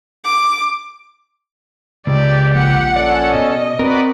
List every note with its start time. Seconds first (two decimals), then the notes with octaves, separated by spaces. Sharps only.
0.24 D6
2.07 C#2 G4 D5
2.54 A#1 A#2 F3 F#5
2.96 C#4 A4 D5
3.34 B2 D#5
3.79 C4 F#4 A#4 B4 D5